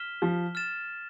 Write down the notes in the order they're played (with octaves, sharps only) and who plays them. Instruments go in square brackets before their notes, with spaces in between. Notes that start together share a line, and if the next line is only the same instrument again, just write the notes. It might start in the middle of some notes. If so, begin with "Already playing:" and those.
Already playing: [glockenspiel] F6 B6 E7 G7
[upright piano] F3
[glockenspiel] F6 A6 E7